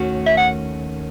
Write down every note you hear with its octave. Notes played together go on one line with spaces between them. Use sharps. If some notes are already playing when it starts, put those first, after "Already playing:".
Already playing: D#2 D#3 A3 C#4 F#4
E5
F#5